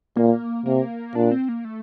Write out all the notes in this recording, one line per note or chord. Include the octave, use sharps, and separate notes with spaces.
A#2 A#3
C3 A#3
A#2 D4
C4
A#3
A3